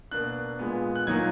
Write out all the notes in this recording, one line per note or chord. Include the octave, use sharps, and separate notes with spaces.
B2 A#3 D4 F#6
A#2 G#3 B3
F#6
A#2 F#3 A#3 D#4 G#6